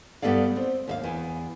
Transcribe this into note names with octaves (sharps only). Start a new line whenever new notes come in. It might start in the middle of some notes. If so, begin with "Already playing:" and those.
G2 B3 G4 A4 D5 F5
C4
D#2 E5 F5
E2